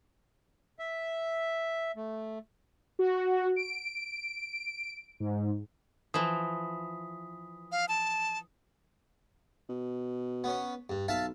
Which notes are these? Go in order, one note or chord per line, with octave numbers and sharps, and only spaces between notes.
E5
A3
F#4
D7
G#2
E3 F3 D#6 B6
F5
A5
B2
B3 C#4
G2
B1 E5 F5 A5